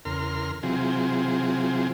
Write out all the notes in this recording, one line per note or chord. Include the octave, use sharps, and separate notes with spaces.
E2 C#3 A#4 C6 F6
C3 E3 F#3 C4 F4 G#4